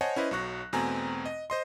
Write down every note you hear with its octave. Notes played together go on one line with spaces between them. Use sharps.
C5 C#5 D#5 F#5 G#5 A5
C#4 E4 B4 C5 D#5
B1 F#3 C#6 F#6 A#6
E2 B2 A3 C4 G#5 A#5
D#5
C5 D#5 C6